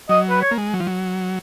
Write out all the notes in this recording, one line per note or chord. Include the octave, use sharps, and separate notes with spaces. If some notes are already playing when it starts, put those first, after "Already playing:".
F#3 D#5
B4
C#5
A#3
G#3
F#3
F3
F#3